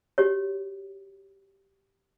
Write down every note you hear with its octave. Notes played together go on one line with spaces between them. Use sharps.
F#4 G4 C#5